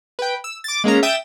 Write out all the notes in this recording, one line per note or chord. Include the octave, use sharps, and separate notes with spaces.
B4 G5
E6
D6 A6
G#3 A#3 C#4 A#5
E5 G5 D#6 G6 A6 E7